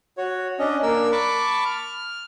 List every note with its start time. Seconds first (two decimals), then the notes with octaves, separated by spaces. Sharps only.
0.18 F#4 C#5
0.59 C#4 D4 D#5
0.83 A#3 D4 A#4 E6
1.12 A5 B5 C#6 D6
1.65 F6